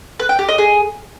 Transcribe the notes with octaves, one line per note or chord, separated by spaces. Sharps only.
B4
G5
G4
D#5
G#4